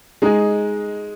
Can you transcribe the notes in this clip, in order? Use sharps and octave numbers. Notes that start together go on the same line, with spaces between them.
G#3 D#4 G#4